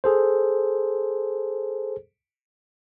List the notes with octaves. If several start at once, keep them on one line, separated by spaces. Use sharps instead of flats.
G#4 A4 C5